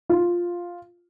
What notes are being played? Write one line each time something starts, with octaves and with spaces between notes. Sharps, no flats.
F4